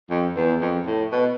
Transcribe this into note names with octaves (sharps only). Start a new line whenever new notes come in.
F2
E2
F2
A2
B2